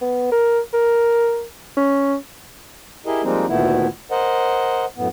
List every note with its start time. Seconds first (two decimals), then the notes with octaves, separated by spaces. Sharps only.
0.01 B3
0.32 A#4
0.73 A#4
1.77 C#4
3.06 E4 G4 G#4 A#4 D#5
3.23 F3 G3 G#3 A#3 C4 D#4
3.48 D2 A#2 D#3 A3 B3 E4
4.11 A#4 C5 D#5 F#5
4.97 F#2 A2 B3